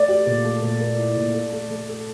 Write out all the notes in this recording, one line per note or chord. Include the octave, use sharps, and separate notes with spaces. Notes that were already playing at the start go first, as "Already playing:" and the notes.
Already playing: A3 D5
G4
A#2
A3
A#2
A#3
E4
A#2
A4
A3
A3
A4